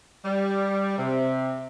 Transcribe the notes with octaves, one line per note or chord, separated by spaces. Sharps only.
G3
C3